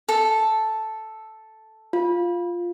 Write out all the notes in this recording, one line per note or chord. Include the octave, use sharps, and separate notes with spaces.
A4
F4